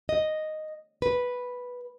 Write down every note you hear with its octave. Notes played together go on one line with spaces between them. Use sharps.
D#5
B4